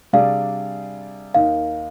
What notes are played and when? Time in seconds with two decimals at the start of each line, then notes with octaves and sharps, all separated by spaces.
0.13 C3 G3 D4 G#4 D5 F5
1.34 D#2 D#3 A#3 D#4 F5